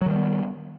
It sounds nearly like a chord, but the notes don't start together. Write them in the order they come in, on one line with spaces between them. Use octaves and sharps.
F#3 D#3 G3 B3